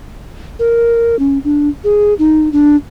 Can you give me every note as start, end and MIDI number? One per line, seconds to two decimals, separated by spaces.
0.59 1.18 70
1.19 1.39 61
1.44 1.69 62
1.84 2.14 68
2.19 2.49 63
2.53 2.76 62